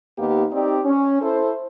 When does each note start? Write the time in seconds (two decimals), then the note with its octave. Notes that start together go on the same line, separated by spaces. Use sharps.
0.18 D#2 A#3 B3 D#4 G4
0.52 C4 D#4 G4 D5
0.85 C#4
1.22 E4 A4 C5